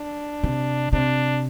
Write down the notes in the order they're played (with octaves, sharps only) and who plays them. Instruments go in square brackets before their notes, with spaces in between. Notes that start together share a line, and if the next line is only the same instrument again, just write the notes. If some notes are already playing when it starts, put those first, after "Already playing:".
Already playing: [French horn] D4
[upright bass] C3
[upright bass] C3 [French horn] D4